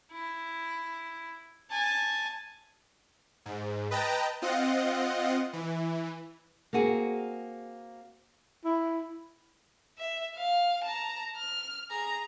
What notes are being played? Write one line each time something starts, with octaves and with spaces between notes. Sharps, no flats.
E4
G#5 A5
G#2
B4 D#5 G5 A5 A#5
C4 F4 D#5 F#5
E3
A#3 C4 F#4 G#4
E4
E5
F5
A5 A#5
F6
G#4 A#5